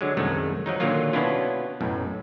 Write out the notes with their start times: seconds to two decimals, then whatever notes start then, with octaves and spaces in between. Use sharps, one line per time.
0.01 D3 F#3 G#3
0.17 C2 F#2 D#3 G#3 A3
0.66 F3 F#3 D#4
0.80 A#2 D3 D#3 F#3 A#3 F4
1.13 B2 B3 C#4 D4 E4 F4
1.81 B1 F#2 A2